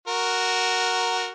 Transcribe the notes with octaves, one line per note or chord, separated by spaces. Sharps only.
F#4 A#4